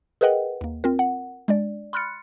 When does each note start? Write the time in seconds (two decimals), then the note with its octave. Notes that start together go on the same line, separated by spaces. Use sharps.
0.21 G#4 A#4 B4 D#5 F#5 G5
0.61 D#2 A#3
0.84 C4 F4 A#4
0.99 F#5
1.48 G#3 D4 D5
1.93 B5 C6 F6 F#6 A6 C#7